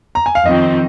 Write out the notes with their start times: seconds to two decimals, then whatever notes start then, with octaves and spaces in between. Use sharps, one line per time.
0.15 A#5
0.26 G#5
0.35 F5
0.46 F2 D#3 C4 D#5